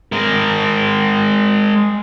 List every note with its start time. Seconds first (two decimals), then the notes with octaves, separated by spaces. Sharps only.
0.12 G#3 A#4